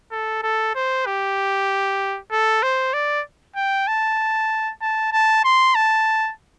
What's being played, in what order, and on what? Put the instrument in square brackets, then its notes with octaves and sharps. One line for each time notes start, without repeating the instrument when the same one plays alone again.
[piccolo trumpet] A4
A4
C5
G4
A4
C5
D5
G5
A5
A5
A5
C6
A5